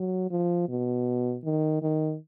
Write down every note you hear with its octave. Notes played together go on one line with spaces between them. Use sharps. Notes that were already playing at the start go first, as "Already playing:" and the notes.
Already playing: F#3
F3
B2
D#3
D#3